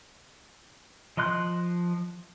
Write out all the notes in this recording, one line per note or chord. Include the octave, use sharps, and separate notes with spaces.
F3 D#5 C6 F#6